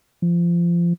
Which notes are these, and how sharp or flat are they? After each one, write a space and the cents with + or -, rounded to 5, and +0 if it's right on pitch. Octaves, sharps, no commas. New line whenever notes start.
F3 -25